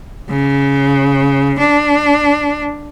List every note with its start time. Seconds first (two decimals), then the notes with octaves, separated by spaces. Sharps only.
0.29 C#3
1.59 D4